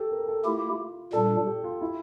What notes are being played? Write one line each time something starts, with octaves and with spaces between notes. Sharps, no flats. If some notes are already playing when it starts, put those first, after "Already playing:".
Already playing: G4 A4
A#4
A4
A3 E4 F4 G4
A#2 G3 D4 A4
G4
F4
E4